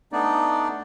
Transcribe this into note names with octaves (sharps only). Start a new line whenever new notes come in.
A3 B3 D4 D#4 D5